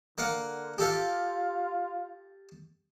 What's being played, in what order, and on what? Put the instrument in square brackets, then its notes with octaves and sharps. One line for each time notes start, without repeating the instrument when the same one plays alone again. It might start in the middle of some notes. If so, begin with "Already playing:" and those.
[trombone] D3 [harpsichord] A#3 F5 F#5
[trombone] F4 [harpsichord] G4 A4 F5